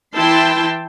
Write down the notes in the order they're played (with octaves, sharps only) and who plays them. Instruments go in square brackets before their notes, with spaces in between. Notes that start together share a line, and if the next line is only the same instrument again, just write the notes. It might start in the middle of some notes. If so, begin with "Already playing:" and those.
[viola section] E3 E4 G5 A5 C6